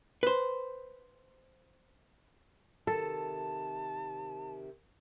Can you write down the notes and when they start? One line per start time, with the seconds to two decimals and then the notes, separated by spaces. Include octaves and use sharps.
0.23 B4 C5
2.87 C3 D#3 A4 A5